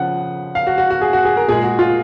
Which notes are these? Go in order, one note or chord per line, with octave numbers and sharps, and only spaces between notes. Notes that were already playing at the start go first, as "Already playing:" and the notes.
Already playing: C#3 F3 F#5
F5
F#4
F#4
F#4
G#4
F#4
G#4
A#4
A#2 G#3 G#4
F#4
F4